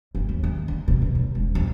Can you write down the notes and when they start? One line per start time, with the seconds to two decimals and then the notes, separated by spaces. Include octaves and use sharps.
0.15 G1
0.29 D#2
0.44 D#3
0.68 D3
0.88 B2
1.02 B2
1.15 C#2
1.35 E1
1.55 F2